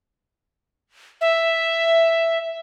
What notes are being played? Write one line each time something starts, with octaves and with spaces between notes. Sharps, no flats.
E5